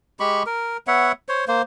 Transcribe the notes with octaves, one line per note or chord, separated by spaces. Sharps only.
G#3 G4 B5 C#6
A#4
B3 C#5 E5 F#5
C5 C#5
A#3 C5